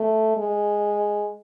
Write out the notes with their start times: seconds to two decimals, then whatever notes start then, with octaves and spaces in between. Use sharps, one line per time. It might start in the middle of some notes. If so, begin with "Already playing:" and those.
Already playing: A3
0.37 G#3